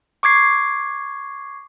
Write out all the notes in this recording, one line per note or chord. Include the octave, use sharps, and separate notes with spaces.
C#6 D6 G#6 C7